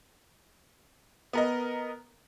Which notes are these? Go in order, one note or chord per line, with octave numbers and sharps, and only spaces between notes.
B3 A#4 D#5